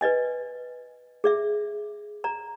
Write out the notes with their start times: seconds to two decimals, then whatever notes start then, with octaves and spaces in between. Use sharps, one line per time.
0.01 B4 D5 D#5 G#5
1.24 G#4 D5 E5
2.24 D5 A#5